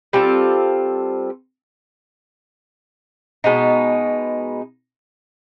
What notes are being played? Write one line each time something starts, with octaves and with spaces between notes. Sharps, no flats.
G3 C4 F4 A4
B2 G#3 B3 D#4